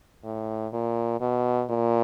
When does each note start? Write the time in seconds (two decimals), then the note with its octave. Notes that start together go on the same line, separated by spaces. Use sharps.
0.24 A2
0.73 A#2
1.21 B2
1.70 A#2